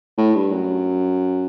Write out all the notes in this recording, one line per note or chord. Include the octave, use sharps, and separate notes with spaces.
A2
G2
F#2